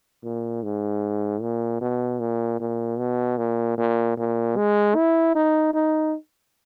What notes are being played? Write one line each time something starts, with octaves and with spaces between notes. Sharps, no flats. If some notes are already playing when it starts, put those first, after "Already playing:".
A#2
G#2
A#2
B2
A#2
A#2
B2
A#2
A#2
A#2
G#3
E4
D#4
D#4